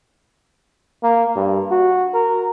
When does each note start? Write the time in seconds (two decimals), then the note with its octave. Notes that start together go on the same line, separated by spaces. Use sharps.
1.03 A#3
1.36 G2
1.71 F#4
2.14 A#4